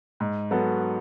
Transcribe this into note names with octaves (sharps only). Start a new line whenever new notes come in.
G#2
F#3 B3 F#4 A4